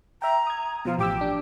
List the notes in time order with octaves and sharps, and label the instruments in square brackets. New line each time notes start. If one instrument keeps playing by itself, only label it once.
[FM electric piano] E5 G5 [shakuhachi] A#5
[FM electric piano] D#6 G#6
[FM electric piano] B2 F3 [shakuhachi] F4
[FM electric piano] A1 D6 E6 [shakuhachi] G4
[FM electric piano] D4